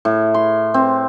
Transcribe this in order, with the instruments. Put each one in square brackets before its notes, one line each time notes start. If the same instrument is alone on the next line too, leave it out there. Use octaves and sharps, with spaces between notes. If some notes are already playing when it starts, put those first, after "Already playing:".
[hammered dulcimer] A2
C6
C4